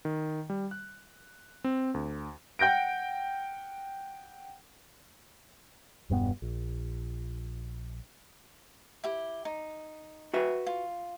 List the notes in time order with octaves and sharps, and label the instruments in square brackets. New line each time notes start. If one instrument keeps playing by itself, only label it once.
[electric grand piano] D#3
G3
F#6
C4
D2
[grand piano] F#5 G5 G6 A#6 D7
[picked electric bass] E1 G2 A#3 B3
A#1
[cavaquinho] E4 G4
D#4
[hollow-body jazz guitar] F#4 B4 E5
[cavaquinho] F4